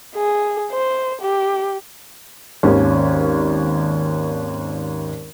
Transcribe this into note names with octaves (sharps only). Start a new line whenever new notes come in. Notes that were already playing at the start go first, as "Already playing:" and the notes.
G#4
C5
G4
G#1 D#2 C#4